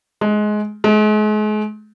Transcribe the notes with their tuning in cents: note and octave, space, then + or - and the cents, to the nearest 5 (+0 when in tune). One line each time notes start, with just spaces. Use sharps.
G#3 +20
G#3 +40